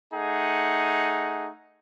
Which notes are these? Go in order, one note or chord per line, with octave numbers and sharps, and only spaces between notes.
A3 D#4 G#4 F#5